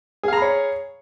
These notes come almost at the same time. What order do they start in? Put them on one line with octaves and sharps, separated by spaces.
G#4 F5 A#5 B5 C#5